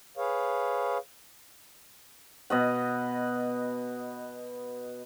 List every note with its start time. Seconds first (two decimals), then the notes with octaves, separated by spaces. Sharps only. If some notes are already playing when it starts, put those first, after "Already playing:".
0.17 G#4 B4 C#5 F5
2.50 B2 D#5 F#5